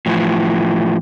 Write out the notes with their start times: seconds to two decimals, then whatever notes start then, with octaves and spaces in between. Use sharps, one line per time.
0.06 A2 E3 F3